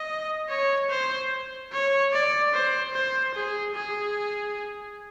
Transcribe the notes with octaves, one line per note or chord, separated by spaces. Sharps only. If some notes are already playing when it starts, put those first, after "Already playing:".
Already playing: D#5
C#5
C5
C#5
D5
C5
C5
G#4
G#4